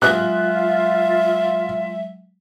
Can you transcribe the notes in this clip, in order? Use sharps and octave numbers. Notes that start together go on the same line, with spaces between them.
F#3 G#3 F4 E5 F#6